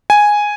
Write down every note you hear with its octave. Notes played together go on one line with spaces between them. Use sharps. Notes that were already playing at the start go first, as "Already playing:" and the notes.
G#5